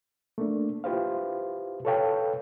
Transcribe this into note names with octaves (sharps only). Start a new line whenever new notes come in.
A3 A#3 D4
E4 F4 G4 B4 C5 F5
A4 B4 C#5 F5 G5 A5